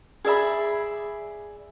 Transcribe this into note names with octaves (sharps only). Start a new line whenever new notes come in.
G#4 D5 E5 B5